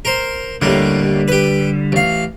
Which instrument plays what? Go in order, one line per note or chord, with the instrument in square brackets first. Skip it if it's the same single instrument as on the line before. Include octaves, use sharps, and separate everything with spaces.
[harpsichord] A#4 C5
[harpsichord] D#2 A2 A#3 [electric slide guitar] D3 G3
[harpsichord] G4 B4
A1 F5